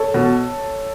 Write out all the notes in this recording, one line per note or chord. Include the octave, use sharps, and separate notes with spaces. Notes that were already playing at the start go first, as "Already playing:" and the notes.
Already playing: A4 C#5
B2